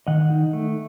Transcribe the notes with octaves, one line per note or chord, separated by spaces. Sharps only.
D#3 D#5 F#5
D#4
A3